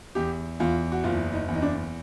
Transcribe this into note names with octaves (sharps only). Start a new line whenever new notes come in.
E2 G4
E2 F4
F#4
F#1 F4
D#4
E2
D#4
D4